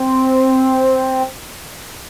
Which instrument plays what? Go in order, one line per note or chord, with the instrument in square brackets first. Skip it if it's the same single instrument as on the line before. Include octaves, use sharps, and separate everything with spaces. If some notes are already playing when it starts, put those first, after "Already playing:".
Already playing: [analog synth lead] C4